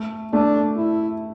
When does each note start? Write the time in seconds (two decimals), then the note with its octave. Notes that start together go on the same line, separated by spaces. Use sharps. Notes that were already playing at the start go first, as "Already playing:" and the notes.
Already playing: A3
0.33 A3 D4
0.77 E4